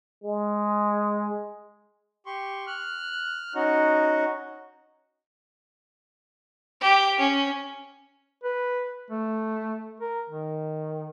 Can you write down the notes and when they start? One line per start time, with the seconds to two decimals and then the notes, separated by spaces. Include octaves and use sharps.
0.24 G#3
2.26 G4 C6 C#6
2.67 F6 F#6
3.55 C#4 D#4 F#4
6.81 G4
7.19 C#4
8.44 B4
9.10 A3
10.00 A#4
10.29 D#3